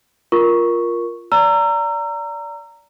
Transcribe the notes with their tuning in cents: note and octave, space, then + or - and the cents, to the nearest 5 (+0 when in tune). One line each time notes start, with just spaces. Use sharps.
F4 +0 A#4 +10 C#6 +0
D5 -20 A#5 -15 E6 +30